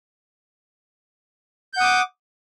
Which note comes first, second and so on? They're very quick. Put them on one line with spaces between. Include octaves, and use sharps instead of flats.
G6 F#5 D#6 D6